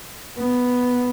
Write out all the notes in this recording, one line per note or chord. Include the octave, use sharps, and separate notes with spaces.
B3